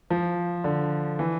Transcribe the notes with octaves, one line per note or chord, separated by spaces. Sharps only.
F3
D3
E3